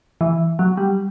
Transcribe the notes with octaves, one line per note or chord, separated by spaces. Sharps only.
E3
F#3
G3